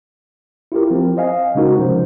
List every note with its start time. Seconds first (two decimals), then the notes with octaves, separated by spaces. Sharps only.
0.72 E4 F4 G4 A#4
0.91 F3 C4
1.17 C5 D#5 F5 G#5
1.55 C#3 G#3 C#4 D#4 F#4 A#4
1.79 C3 F3 C5